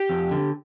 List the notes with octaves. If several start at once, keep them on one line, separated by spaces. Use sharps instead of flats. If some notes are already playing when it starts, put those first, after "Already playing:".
Already playing: G4
F2
D3